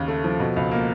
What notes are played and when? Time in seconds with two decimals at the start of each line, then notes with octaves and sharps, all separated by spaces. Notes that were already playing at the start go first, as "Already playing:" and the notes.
Already playing: D#2 C#3
0.08 A3
0.24 F3
0.40 B2
0.56 C#2
0.71 A#3